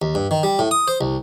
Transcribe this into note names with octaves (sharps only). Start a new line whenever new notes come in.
D#2
G2
D#3
G3
A2
D#6
C5
C2